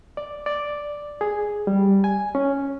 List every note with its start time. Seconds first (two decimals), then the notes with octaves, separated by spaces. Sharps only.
0.17 D5
0.46 D5
1.21 G#4
1.67 G3
2.04 G#5
2.35 C#4